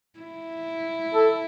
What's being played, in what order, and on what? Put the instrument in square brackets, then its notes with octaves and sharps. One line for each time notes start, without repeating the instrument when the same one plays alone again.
[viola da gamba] E4
[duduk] A4